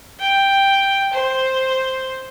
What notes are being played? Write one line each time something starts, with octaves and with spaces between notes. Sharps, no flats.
G5
C5